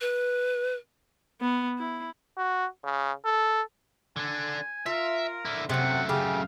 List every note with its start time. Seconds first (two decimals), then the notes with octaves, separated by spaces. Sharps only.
0.01 B4
1.41 B3
1.78 E4
2.37 F#4
2.84 C#3
3.25 A4
4.16 D3 D4 G#5
4.86 F4 A#4 E5
5.45 D3 E4
5.69 F#2 C3 A3 C4 F#5
6.09 C#3 G4 F5